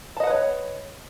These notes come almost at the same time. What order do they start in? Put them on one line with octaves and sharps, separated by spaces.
A5 D#5 F#5 B4 C#5